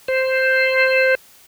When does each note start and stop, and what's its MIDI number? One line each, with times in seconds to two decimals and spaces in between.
0.08 1.15 72